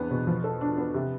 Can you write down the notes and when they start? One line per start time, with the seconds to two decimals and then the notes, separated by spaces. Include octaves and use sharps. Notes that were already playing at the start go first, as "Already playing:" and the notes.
Already playing: E2 B3 C4 D4
0.11 B2
0.27 F3
0.44 A4
0.61 D4
0.78 B3
0.94 C3